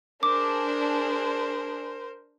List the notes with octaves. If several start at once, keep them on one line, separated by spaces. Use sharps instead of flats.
D4 G#4 A#4 C5 D6